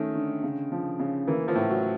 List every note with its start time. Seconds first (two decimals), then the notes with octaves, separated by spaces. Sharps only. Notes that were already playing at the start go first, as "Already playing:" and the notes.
Already playing: D#3 A3 C#4
0.15 D3
0.43 C#3
0.72 F3
0.99 C#3
1.27 E3 A#3
1.48 F3
1.55 A2
1.69 F#3